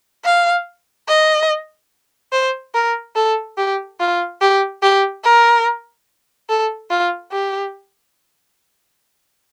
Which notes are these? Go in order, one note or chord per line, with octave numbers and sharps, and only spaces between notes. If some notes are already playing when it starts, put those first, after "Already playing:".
F5
D#5
C5
A#4
A4
G4
F4
G4
G4
A#4
A4
F4
G4